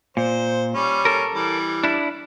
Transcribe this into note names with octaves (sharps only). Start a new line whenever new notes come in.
A#2 C5
G3 C#4
A4 A#4
E3 G3
D4 E4